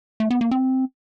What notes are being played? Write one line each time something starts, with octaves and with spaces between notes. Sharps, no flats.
A3
B3
A#3
C4